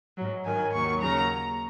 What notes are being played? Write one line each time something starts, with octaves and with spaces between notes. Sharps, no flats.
G#2 F#3
G#2 D#3 F#3 G#5
D#2 D#3 F#3 C#6
D#2 C#3 F#3 A#5